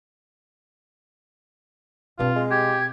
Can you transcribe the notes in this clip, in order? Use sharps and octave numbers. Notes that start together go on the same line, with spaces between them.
G2 B2 C4 F4
G#3
G4 G#6